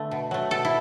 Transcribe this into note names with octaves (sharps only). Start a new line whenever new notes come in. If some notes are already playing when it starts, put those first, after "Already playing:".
Already playing: D3 A3 B4
B2
F#3 A3
B2 A4
E4